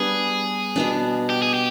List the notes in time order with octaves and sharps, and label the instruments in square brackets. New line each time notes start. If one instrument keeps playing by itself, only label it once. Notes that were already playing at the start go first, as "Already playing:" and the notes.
Already playing: [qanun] G3 B3 D4 [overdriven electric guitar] G#4
[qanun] B2 B3 D4
[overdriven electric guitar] G4
G#4
G4